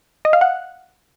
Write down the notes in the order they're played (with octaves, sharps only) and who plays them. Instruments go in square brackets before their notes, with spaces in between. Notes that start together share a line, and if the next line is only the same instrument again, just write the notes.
[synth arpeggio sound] D#5
F5
F#5